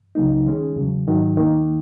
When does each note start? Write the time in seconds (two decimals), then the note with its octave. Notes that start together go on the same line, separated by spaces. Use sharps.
0.15 C#2 C#3 F#3 A#3 D#4
0.46 D#3 G#3 C#4 G#4
0.76 E2 C#3 F#3
1.07 G#2 D#3 F#3
1.37 D#2 D#3 A#3